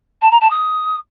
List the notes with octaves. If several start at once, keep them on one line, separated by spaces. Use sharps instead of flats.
A5
A#5
A5
D#6